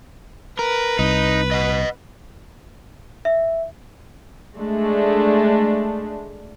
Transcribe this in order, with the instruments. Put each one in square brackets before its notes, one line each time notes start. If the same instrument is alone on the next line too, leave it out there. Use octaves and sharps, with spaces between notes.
[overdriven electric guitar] A#4 [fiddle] B4
[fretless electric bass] C2 [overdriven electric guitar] D#4
[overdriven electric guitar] D#5 F#5
[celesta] E5
[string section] G#3 A3 D4